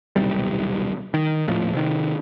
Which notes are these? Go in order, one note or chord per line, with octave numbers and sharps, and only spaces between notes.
D#1 B1 C3 G3
D#3
D#1 A2 F3
C3 D#3